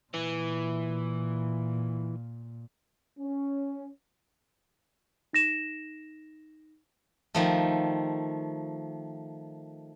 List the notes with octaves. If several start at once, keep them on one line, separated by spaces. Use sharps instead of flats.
A#2 E3
C#4
D#4 A#6 E7
D#3 F3 A3